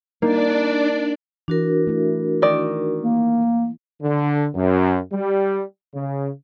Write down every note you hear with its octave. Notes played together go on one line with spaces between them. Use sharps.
A#3 D4 D#4 D5
E3 D4 F#4 A#4
A3 E4
D#3 D5
A#3
D3
F#2
G3
C#3